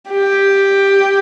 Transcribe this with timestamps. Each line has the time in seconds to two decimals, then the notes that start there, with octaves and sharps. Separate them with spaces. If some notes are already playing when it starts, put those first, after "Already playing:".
0.11 G4